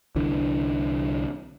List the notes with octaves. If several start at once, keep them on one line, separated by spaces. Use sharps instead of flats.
C2 D3 E3 D4